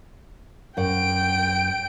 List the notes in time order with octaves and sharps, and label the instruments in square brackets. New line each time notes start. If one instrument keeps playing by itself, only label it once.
[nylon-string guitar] F#2 F#5 [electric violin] G5 D7